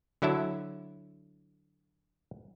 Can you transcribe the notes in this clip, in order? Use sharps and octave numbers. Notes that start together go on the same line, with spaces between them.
D3 F#3 E4 E5 A5